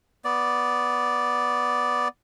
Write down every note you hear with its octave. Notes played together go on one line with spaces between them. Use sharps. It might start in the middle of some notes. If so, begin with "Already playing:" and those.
B3 D5